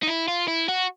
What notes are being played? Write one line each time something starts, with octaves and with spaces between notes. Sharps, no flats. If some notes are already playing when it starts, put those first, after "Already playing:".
D#4
E4
F4
E4
F#4